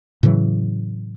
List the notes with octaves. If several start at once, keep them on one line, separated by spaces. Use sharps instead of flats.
A2 C#3 E3 F#3